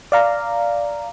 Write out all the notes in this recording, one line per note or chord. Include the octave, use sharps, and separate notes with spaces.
D5 F5 A#5